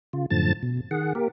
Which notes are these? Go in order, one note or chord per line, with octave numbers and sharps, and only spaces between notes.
C#3 F4
F#2 A2 D3 F3 A5 A6
B2
D#3 G#4 F#5
A#3 G4 A#4